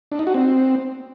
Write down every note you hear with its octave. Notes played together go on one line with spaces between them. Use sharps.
D4
D#4
F#4
C4